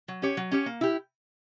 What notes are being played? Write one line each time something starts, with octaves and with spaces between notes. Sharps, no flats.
F#3
C#4 G4 C#5
F#3
C#4 G4 C#5
A#3
E4 G4